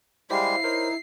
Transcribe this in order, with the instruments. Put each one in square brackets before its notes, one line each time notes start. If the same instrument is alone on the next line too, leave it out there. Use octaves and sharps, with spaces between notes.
[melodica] G3 G#3 G4 [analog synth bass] E4 [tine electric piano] C5 F5 [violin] C7
[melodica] D#4 [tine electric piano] A#4 C5 C#5